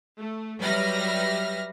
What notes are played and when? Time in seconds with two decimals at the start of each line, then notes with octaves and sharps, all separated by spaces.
0.18 A3
0.61 F#3 G3 B4 E5 F6 A#6